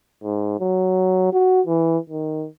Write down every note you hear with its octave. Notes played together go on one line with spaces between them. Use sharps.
G#2
F#3
F#4
E3
D#3